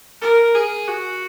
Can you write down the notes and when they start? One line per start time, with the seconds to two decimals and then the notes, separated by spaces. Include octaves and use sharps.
0.21 A#4
0.55 G#4
0.88 F#4